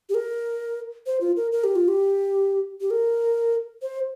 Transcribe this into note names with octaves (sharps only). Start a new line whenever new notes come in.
G4
A#4
C5
F4
A#4
A#4
G4
F4
G4
G4
A#4
C5